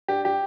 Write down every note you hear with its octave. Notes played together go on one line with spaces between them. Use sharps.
D4 G4
G4